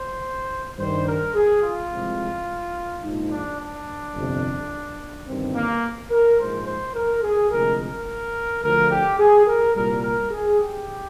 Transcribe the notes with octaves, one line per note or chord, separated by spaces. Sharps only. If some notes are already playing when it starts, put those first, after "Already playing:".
Already playing: C5
G2 D#3 G3 C5
A#4
G#4
F4
C2 C3 F3 G#3
A#1 G#2 F3 G#3 D#4
D4
D4
G1 F2 C3
G1 G2 D#3 C4
A#3
A#4
A#1 G#2 F3 G#3 C5
C5
A#4
G#4
D2 C3 F3 G#3 A#4
A#4
D2 D3 F3 A#4
G4
G#4
A#4
C2 A#2 G3 A#4
A#4
G#4
G4